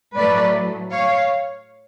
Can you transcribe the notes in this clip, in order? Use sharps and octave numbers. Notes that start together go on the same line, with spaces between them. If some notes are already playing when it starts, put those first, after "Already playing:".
A2 F#3 A3 B4 D5
C#5 F5